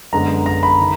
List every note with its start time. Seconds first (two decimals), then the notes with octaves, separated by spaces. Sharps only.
0.12 F#2 D3 G#3 B3 A#5
0.46 A#5
0.63 B5
0.80 D#3